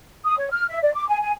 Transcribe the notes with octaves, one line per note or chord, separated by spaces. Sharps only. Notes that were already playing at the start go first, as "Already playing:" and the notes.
D#6
C#5
F6
E5
D5
D6
G#5
G#5